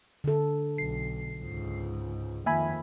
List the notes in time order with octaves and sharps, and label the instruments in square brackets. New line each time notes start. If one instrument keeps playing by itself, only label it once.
[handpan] D3 A4
[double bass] B1 [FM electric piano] C7
[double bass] C#2 G#2
[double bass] F2 D#3 [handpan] A#3 [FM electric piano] E5 G#5 B5